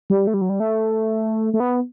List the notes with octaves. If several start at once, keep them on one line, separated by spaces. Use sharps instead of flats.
G3
A3
G3
F#3
G3
A3
A3
B3